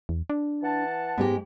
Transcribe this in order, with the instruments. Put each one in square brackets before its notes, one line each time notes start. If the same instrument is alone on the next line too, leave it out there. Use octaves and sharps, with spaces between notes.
[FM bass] E2
D4
[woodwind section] E3 F#5 A5
[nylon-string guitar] G#2 G#3 G4 [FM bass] B3